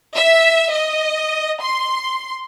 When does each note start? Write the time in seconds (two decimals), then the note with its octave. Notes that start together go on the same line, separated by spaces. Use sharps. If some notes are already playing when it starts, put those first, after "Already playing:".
0.16 E5
0.71 D#5
1.61 C6